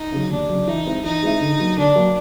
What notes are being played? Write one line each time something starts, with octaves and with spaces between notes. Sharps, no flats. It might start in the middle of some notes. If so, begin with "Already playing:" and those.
Already playing: D#4
C#3 F#3
D#2 D4
C#3 F#3
E3 D#4
G#3 C4 E4
E3 D#4
G#3 C4 E4
D3
F#3 A#3
D3 D4
F#3 A#3